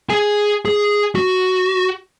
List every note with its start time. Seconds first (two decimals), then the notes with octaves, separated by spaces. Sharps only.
0.10 G#4 G#5
0.65 G#4
1.15 F#4